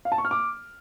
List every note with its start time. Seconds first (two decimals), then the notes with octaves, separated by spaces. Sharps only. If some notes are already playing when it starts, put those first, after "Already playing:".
0.05 F5
0.12 A5
0.18 C#6
0.25 F6
0.31 D6